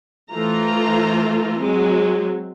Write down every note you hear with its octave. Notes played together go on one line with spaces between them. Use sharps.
E3 A3 F4 C5 A#5
F#3 G#3 C4